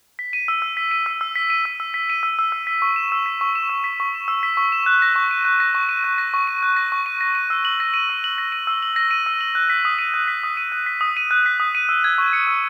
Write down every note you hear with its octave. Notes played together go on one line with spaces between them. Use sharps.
B6
D#7
E6
E6
B6
D#7
E6
E6
B6
D#7
E6
E6
B6
D#7
E6
E6
E6
B6
C#6
E7
E6
B6
C#6
E7
E6
B6
C#6
E7
E6
B6
C#6
E7
F#6
A#6
C#6
D#7
F#6
A#6
C#6
D#7
F#6
A#6
C#6
D#7
F#6
A#6
C#6
D#7
A#6
D#7
E6
F#7
A#6
D#7
E6
F#7
A#6
D#7
E6
F#7
A#6
D#7
E6
F#7
F#6
B6
D#6
D#7
F#6
B6
D#6
D#7
F#6
B6
D#6
D#7
F#6
B6
D#6
D#7
E6
G#6
C#6
C#7
E6